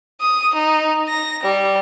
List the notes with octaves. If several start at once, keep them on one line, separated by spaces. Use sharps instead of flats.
D#6
D#4
A#6
G3